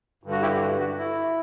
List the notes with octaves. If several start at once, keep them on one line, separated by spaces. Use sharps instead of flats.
G2 D3
F#4
E4 G4
F#4
F#4
E4